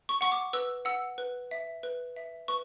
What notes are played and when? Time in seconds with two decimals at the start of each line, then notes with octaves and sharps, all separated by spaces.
0.09 C#6
0.21 F#5 C#6
0.32 D6
0.53 B4 E6
0.85 F#5 E6
1.18 B4
1.51 E5
1.83 B4
2.17 E5
2.48 B4 C#6